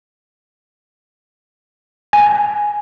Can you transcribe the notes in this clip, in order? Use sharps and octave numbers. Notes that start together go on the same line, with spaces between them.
G#5